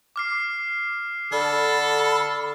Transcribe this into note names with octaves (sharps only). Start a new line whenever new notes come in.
D6 F6 C7
D3 A4 B5 F6